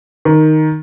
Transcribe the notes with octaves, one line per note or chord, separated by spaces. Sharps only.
D#3